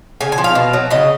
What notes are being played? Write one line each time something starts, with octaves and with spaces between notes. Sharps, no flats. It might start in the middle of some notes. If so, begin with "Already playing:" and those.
C#3 G#5
G#5
F3
F5
B2
F#3
C#3 D#5